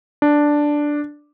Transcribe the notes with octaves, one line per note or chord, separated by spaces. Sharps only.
D4